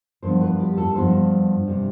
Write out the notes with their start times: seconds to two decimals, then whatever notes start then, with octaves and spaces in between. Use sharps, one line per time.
0.22 G2 F3 B3 C5
0.41 B4
0.60 G4
0.77 A4
0.95 G2 F3 B3 C5
1.67 C3 G3